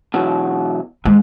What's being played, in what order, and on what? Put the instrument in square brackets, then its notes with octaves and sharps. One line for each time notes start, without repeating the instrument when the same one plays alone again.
[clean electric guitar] B2 E3 F#3
[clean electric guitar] G#2 [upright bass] G#3